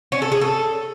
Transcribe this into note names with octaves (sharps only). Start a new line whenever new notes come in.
C#4
A4
G#4
A4